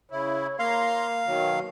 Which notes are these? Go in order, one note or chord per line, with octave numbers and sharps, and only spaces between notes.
C#3 E4 C#5
A#3 F5 A#5 C6
B2 D#3 F#3